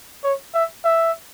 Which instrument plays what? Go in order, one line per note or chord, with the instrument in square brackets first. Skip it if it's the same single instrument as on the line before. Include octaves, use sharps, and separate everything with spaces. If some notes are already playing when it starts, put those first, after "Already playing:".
[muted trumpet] C#5
E5
E5